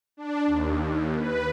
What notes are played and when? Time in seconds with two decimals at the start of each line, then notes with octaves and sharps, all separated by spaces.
0.17 D4
0.47 D#2
1.17 B4